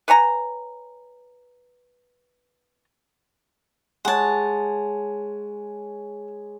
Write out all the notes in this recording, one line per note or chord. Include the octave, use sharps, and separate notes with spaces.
B4 C#5 G#5 A#5
G#3 C#5 F#5 A5